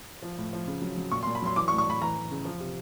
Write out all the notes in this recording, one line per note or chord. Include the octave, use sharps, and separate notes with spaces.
F3
A2
F3
C#3
F#3
F#3
A#2 C#6
C6
A#2
B5
F#3 C6
E3 D6
C#6
A2
C#6
A2 B5
E3 A#5
E3
C#3
F3
C3